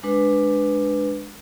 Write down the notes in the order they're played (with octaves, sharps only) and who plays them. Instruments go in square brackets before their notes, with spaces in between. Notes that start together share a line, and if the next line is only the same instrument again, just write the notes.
[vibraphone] G#3 D4 B4